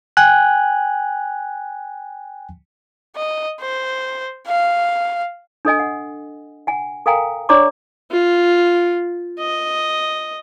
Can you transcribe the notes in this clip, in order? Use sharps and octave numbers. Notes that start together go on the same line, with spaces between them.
G5 G#5 F#6
D#5
C5
F5
D4 A4 D#5 G#5
F#5
F#5 G#5
A4 A#4 F5 G5 G#5 A#5
D4 C#5 D5 A#5 C#6 D6
F4
D#5